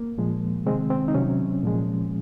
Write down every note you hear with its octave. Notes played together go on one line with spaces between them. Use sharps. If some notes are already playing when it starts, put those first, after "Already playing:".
Already playing: A#3
A#2 F3 G#3
C3 D#3 G#3 C4
C4
D#4
C3 F#3 C#4
A#2 F3 G#3